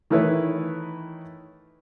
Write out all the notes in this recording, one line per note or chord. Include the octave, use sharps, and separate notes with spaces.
D#3 E3 A3 E4 B4 C#5